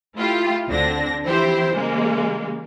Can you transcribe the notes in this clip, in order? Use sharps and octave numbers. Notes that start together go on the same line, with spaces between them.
A3 E4 F4 G4
D2 D3 C4 D4 A#6
E3 F3 C4 E4 G4 C5
C#3 E3 G3 G#3 A#3